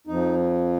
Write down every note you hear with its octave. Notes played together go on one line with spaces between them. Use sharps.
F2 F3 D#4